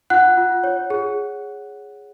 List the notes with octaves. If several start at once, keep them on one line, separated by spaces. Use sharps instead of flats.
F4 F#5 F#6
F4
C#5
G#4